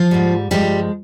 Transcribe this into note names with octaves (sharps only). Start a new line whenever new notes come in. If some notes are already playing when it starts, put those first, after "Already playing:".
Already playing: F3 F4
G#2 G3
G2 F3 G3 G#3 G4